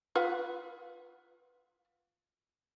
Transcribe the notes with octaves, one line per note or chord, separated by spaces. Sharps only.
F4 B4 F#5